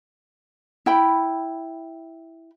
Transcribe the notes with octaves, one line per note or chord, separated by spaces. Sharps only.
E4 G5 B5